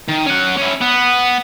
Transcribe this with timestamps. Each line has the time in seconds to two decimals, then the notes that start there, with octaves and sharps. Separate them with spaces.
0.08 D#3
0.26 C#4 F#5
0.57 C#4 E4
0.81 B3